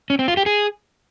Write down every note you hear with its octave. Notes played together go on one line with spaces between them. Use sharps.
C#4
C4
F4
G4
G#4